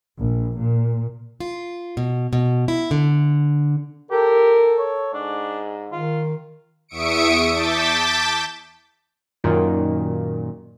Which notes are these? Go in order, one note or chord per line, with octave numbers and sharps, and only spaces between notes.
A#1
A#2
F4
B2
B2
E4
D3
G4 A4 A#4
C#5
G#2 D4
D#3 F4
E2 E5 C#6 D#6 C#7 D7
A5 D6 G6 A6 B6
F#2 A#2 D#3